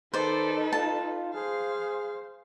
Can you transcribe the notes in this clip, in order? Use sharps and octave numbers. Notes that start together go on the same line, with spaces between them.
D#3 D#4 A4 B4 C5 D5
F4 A5
G#4 C5 F5